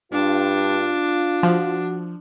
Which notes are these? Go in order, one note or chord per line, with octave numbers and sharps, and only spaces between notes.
G2 D4 F4
F3 F#4